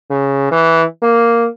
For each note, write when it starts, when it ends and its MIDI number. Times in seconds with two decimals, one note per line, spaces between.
0.10 0.48 49
0.51 0.83 52
1.03 1.48 58